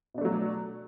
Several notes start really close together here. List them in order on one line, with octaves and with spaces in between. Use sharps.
B2 D4 A3 F#3